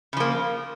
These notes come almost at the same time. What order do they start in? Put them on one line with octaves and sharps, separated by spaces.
C#3 F3 A#3